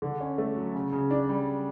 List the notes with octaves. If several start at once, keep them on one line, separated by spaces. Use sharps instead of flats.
D3
C#4
A3
F#3
C#3
C#3
D4
G3